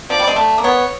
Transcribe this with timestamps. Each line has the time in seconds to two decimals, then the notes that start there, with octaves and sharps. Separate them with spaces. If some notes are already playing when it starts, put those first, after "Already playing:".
0.10 F3 D5
0.19 G3
0.27 G#3
0.36 A3
0.58 A#3
0.64 B3 C#5